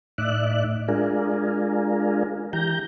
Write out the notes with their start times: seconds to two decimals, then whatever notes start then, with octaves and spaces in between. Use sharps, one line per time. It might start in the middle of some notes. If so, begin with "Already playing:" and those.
0.18 A2 D#4 D5 E5 F#6
0.88 G#3 D4 F4 G#4 A#4
2.53 E3 G4 A#5 G6